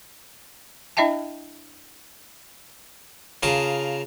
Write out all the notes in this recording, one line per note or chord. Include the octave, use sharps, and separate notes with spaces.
D4 E4 D#5 E5 G5 A5
C#3 F4 G#4 A#4 A5 A#5